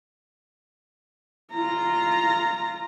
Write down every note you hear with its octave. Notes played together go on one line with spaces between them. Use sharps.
F4 A#5